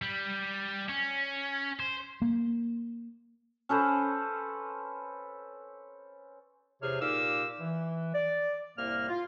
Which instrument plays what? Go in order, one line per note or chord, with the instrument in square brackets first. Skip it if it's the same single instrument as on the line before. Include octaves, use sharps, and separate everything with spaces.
[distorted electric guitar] G3
C#4
C5
[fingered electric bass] A#3
[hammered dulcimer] C#4 A4 B4 C5
[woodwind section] E2 C3 G#4 C5 C#5 F6
A#2 D#4 G4 F5 D6 E6
E3
D5
C2 A2 A#3 F6
F4